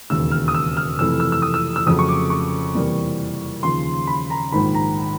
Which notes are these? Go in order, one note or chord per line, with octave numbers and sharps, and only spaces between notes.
E1 D#2 C#3 E6
F6
D#6
E6
F6
F2 C3 E3 A3 E6
E6
E6
D#6
E6
E6
F2 C#3 F#3 A3 D#6
C#6
D6
C#6
E2 C3 E3 G3 A#3
D#2 C#3 F3 C6
B5
A#5
A#1 G#2 D#3 B5
A#5